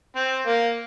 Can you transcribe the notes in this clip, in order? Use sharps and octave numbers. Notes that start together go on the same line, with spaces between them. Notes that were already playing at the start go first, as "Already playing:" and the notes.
C4
A#3